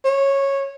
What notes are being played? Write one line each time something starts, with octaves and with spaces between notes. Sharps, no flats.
C#5